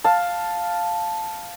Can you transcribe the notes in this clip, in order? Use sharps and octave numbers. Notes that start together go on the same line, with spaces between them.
F5 A5